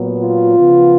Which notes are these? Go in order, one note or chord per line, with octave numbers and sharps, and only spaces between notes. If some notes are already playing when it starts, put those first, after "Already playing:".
Already playing: A#2 F#3 B3
F4
C#3 F3 B3